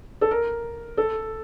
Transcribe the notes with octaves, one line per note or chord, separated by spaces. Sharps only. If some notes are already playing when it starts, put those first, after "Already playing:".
A4
A#4
A4